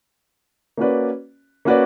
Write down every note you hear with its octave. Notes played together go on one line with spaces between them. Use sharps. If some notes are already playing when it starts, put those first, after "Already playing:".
A#3 C#4 F#4 B4 D5
A#3 C#4 F#4 B4 D5